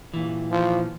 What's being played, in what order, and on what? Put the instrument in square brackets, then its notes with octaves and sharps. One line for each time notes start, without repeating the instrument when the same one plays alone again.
[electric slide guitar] A#2 E3
[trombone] F3